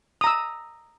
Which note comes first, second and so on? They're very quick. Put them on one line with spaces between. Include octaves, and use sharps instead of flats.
D#6 A#5 E6